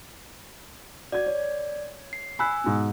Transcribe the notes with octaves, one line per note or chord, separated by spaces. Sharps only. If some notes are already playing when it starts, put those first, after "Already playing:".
F#4 D5 G#6
C#5
C7
G#5 B5 E6 F#6
G#2 B2